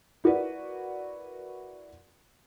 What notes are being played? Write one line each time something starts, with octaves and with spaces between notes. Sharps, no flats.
E4 F#4 A#4 B4 D5